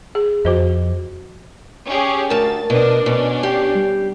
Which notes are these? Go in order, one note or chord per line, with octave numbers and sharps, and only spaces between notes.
G#4
F2 F#4 C5 D#5
C#4 G4 G#4
D2 A#4 A5 A6
B2 D4 D#5
B2 C#4 D4
G4 C7
G3